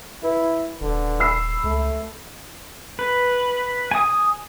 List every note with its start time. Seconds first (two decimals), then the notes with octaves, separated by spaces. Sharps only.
0.23 E4 B4
0.81 D#1 D3
1.20 B5 E6 C7
1.64 C#2 A3
2.99 B4
3.91 G#5 D#6